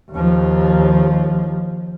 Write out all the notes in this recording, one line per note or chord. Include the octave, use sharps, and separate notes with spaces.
D#2 F3